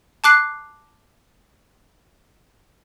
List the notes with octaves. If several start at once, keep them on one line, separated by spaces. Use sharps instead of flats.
A5 D6 F#6 C7